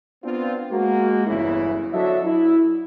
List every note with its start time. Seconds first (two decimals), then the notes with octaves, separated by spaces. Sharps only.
0.24 B3 C4 D4 F4
0.71 G#3 A#3 F#4
1.27 G1 E2 C#3 E3 C#4 E4
1.93 F#3 D4 F#4 A4 D#5 E5
2.25 E4